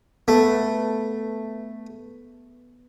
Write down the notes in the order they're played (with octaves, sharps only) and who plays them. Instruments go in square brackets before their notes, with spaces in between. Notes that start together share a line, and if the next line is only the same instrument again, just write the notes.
[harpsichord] A3 [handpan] B3 B4